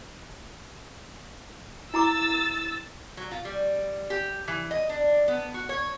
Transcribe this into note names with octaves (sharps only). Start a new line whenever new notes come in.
E4 A#5 D6 E6 A6
F#3
F4
G3
G4
E3
D#5
D4
B3
F#4
C#5